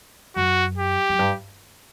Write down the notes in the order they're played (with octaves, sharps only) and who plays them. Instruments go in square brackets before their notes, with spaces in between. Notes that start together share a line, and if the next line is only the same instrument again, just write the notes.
[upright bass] F#2 [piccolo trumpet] F#4
[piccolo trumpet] G4
[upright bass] F#2
G2